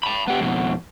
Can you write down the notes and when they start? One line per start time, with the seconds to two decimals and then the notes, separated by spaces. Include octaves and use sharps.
0.03 A5 B5
0.28 B3 G4
0.41 F2 B2